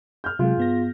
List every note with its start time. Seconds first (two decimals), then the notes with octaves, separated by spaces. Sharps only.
0.24 F6 G6
0.39 C3 F#3 G#3 F4 G#4
0.57 G2 B3 A#6